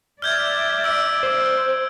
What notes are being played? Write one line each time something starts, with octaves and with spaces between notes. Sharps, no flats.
D5 E5 F6 G6 G#6
E6 D7
C5